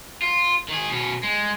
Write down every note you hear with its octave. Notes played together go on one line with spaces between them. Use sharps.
F4
D#3 G#4
B2 C#4
G#3